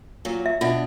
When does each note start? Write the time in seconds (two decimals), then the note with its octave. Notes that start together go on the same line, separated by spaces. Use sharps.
0.25 A#2 F#3
0.46 E5
0.61 B2 D4 F4 E5